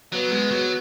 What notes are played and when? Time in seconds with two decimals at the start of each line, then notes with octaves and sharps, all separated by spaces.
0.13 F#3 B3
0.32 G#3
0.51 F#3